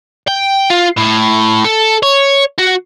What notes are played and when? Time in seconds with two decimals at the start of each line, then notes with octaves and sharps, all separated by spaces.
0.28 G5
0.70 F4
0.97 A2
1.65 A4
2.03 C#5
2.59 F#4